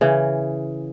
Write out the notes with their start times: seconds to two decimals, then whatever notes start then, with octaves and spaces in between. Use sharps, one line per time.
0.01 C#3 E3